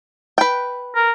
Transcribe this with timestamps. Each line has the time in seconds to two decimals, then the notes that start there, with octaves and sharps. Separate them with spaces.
0.38 B4 G5
0.95 A#4